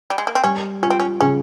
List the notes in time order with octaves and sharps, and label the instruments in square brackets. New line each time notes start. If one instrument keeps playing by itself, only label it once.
[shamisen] G3
G#3
A#3
C4
[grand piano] G3 [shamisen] C#4
[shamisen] C#4 [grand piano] F4
[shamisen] C4
C#4
[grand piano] C#3 [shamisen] C#4